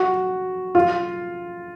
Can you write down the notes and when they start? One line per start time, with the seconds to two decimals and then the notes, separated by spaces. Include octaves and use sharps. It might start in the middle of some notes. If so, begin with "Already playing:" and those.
Already playing: F#4
0.75 F4